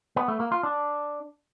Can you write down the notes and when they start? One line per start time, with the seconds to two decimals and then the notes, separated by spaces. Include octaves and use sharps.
0.16 B3
0.28 A3
0.40 A#3
0.52 F4
0.63 D4